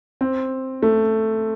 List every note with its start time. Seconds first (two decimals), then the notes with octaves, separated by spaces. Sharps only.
0.21 C4
0.83 A3